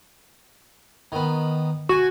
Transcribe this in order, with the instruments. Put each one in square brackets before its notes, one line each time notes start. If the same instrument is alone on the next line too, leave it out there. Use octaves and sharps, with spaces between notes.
[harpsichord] D#3 B3
[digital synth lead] F#4 [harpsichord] G#5 C#6